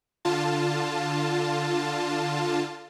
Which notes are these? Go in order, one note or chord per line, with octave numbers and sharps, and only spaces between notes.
D3 F4 A5